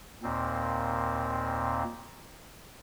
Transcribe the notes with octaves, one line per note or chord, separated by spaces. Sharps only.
D#2 A#2 C4